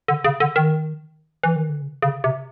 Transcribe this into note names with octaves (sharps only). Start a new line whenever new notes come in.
D3
C#3
D3
D#3
E3
D#3
D3
C#3
C#3
C3